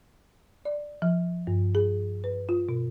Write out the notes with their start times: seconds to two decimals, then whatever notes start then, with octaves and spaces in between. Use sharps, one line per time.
0.65 D5
1.02 F3
1.47 G2
1.75 G#4
2.24 B4
2.49 F4
2.69 B2